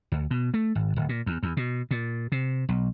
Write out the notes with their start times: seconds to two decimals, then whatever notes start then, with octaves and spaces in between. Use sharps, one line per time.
0.12 D2
0.31 B2
0.54 A3
0.75 G#1
0.96 D1
1.09 A#2
1.26 E2
1.43 E2
1.57 B2
1.91 A#2
2.32 C3
2.69 B1